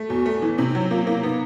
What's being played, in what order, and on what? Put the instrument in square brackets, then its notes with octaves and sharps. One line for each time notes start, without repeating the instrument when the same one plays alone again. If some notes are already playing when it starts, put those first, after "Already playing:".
Already playing: [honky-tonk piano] A3
[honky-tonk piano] E2 [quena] F#4
[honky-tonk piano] A3
E3
[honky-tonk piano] C3 [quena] E4
[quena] D#4
[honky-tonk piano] F#3 [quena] E4
[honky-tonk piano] A#3 [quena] F4
[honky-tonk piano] A#3 [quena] E4
[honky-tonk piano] B3 [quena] D#4